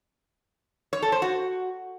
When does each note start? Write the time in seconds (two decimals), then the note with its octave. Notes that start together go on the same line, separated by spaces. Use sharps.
0.93 C#5
1.02 A4
1.12 C5
1.22 F#4